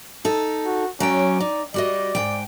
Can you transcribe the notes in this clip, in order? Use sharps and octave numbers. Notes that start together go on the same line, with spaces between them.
D#4 A4
F#4
F#3 C#4 D5 G5
D#4 D5
G3 F#4 D5 D#5
G#2 E3 G5